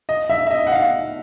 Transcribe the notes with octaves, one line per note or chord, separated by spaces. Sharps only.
D#5
E5
E5
D#5
F#5
F5